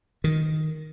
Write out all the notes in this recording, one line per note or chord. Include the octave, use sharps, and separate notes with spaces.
D#3